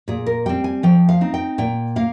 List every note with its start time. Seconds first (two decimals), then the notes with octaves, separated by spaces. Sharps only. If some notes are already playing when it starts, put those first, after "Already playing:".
0.08 A#2 G#4
0.26 A#4
0.46 G3 C4 G5
0.64 G#5
0.83 F3 G5
1.09 F5
1.21 C4 D#4
1.34 G5
1.58 A#2 G5
1.96 A#3 F5